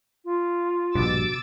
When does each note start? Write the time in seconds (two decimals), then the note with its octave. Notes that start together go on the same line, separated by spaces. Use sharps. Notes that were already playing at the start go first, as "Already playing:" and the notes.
0.25 F4
0.95 A#1 G2 B2 D6 E6 A6